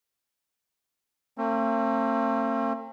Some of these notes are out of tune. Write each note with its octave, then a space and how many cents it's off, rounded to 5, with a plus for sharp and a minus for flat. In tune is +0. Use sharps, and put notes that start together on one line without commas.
A3 +45 C4 +40